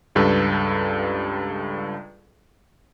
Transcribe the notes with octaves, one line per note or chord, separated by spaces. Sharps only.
C#2 G2 A4 B4